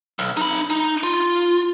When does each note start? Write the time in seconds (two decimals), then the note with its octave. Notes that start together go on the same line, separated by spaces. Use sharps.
0.19 B1
0.37 D#4 B5
0.70 D#4
1.03 F4